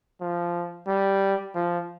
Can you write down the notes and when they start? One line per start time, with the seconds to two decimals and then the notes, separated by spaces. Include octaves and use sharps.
0.21 F3
0.87 G3
1.55 F3